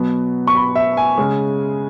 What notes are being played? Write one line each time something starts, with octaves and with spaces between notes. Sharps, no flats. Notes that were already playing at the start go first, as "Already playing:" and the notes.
Already playing: B2 F#3 B3
C#6
B5
E5
G#5
C#3 G#3 C#4